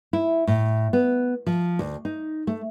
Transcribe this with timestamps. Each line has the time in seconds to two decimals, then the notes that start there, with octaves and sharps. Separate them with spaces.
0.13 E4
0.47 A2
0.93 B3
1.47 F3
1.79 D2
2.05 D#4
2.47 A3